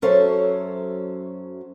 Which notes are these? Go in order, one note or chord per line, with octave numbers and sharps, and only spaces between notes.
F#2 F#3 C#4 A4 C5 E5